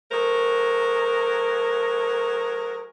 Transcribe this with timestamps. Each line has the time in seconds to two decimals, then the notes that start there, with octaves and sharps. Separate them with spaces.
0.12 F#3 A3 G#4 A#4 C5